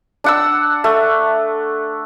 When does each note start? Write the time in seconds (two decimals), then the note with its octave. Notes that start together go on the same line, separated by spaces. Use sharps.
0.24 D4 F#5 E6
0.84 A3